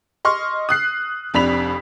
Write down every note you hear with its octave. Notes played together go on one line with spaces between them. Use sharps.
D#5 C6 C#6 F6
D#6 F#6 C7
F1 F2 D4 B5 B6 F7